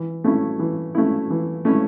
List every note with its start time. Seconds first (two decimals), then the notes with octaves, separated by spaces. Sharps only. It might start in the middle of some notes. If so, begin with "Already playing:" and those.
Already playing: E3
0.24 A3 C#4 E4
0.59 E3
0.95 A3 C#4 E4
1.30 E3
1.65 A3 C#4 E4